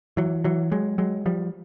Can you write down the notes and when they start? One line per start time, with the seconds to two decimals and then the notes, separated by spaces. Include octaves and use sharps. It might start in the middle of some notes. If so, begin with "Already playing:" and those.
0.17 E3 F#3
0.44 E3 F#3
0.71 F#3 G#3
0.98 F#3 G#3
1.26 F3 G3